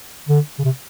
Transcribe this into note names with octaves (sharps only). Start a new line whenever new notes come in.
D3
C#3
C3